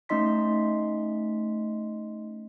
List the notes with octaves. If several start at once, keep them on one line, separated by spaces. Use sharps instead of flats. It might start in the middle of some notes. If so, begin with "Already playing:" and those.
A3 C#4 D#4 D#5 C6 B6